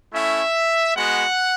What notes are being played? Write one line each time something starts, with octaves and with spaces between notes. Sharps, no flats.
A3 C#4 E4 E5
G#3 B3 F#4 F#5